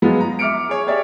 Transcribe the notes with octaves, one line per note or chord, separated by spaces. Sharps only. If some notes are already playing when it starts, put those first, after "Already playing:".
F3 F#3 G#3 B3 F4
A#5
E5 D6 F6 C#7 D7
G#4 C#5
G4 G#4 C#5 D5 E5